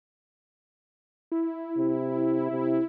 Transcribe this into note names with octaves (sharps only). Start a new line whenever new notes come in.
E4
C3
C3